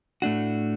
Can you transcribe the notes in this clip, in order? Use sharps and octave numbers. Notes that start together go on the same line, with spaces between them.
A2 A3 D4 F#4